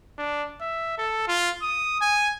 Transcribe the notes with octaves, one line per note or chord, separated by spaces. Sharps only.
D4
E5
A4
F4
D#6
G#5